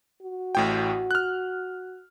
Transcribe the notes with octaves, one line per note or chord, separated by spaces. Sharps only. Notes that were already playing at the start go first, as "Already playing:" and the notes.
F#4
A1 A2 G5
F6 F#6